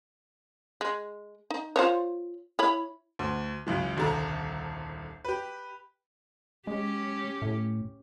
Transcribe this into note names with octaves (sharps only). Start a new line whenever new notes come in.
G#3
D#4
F4 C5 C#5
E4 C#5 B5
D2
C#2 F#2 E3
D#1 C2 D3 A4 A#5
G4 B4
G#3 C#4 G4
A2